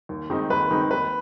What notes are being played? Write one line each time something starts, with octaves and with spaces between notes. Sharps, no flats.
D#2
D#3 G#3 C4 D#4
D#2 B4
D#3 G#3 C4 D#4
D#2 B4